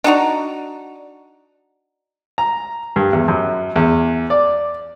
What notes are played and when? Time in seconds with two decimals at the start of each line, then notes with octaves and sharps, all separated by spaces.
0.04 D4 D#4 F#4 A#5
2.38 A#5
2.96 G2
3.13 E2
3.28 F#2
3.76 E2
4.30 D5